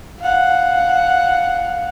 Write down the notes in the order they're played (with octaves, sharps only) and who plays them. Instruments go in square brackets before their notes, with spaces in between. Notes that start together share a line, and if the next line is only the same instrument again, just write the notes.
[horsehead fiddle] F5 F#5